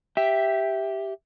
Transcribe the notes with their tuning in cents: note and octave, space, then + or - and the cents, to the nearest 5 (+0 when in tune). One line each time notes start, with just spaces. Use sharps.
G4 +0 E5 +0